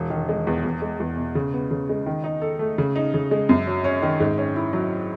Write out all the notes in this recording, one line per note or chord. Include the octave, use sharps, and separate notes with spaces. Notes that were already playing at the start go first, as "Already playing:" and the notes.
Already playing: E1
D#3
G#3
E2
E2
G#3
E2
B2
C#3
B3
C#3
G#3
D#3
D#4
A4
A3
C#3
D#4
C#3
G#3
F#2
F#3
C#4
D#3
G#2
C#4
E4
F#3